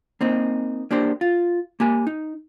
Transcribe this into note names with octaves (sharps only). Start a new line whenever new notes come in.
A#3 C4 D#4
A#3 D4 G4 C5
F4
A#3 G4 G#5
D#4